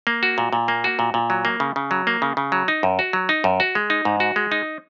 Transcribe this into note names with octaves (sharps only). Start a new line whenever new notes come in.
A#3
F#4
A#2
A#2
A#3
F#4
A#2
A#2
F#3
A#3
C#3
C#3
F#3
A#3
C#3
C#3
F#3
D#4
F#2
F#4
F#3
D#4
F#2
F#4
G#3
D#4
G#2
F#4
G#3
D#4